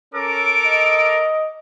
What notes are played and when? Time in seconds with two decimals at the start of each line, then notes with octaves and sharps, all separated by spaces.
0.14 C#4 A4 A#4 D6
0.66 D#5